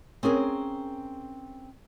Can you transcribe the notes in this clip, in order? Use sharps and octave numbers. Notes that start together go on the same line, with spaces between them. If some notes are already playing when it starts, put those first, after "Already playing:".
C4 C#4 G#4 A#4